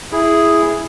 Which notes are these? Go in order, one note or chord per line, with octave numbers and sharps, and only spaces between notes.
E4 G#4